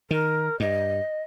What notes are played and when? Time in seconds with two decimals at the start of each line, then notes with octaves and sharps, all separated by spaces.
0.11 D#3 A#4
0.60 G2 D#5